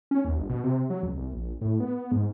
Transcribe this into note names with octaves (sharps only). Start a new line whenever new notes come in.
C#4
D#2
G1
B2
C3
F#3
C#2
C2
A#1
A2
B3
G#2